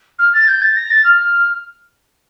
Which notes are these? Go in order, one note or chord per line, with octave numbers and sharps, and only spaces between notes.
F6
A6
G6
A6
A#6
A6
F6